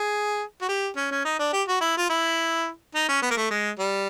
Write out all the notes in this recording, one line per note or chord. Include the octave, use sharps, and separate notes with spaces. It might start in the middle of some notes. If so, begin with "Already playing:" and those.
Already playing: G#4
F#4
G4
C#4
C#4
D#4
D4
G4
F#4
E4
F4
E4
D#4
C#4
B3
A#3
A3
G#3
G3